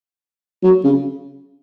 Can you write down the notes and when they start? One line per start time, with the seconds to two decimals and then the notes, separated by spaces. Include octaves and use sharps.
0.63 F#3
0.84 C#3